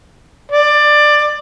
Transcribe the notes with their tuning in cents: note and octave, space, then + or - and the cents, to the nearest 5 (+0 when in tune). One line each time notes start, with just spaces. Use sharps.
D5 +15